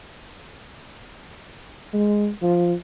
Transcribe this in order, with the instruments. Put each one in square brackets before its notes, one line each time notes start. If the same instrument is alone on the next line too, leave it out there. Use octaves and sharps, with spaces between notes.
[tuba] G#3
F3